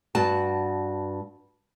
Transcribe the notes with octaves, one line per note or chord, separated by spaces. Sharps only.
G2 F#4 A5